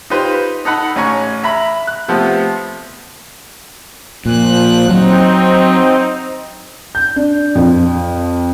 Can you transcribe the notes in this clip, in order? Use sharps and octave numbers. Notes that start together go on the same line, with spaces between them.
D#4 F4 G4 B4 C5
D#4 A4 F#5 B5
A1 C#4 G#5 A#5 C#6
E5 A#5 B5
F#6
C3 F3 A3 B3
A#2 F3 F#6
F#3 C4 D#4
G6
D4
F2